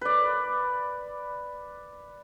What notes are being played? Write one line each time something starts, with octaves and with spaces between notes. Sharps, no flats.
B4 D5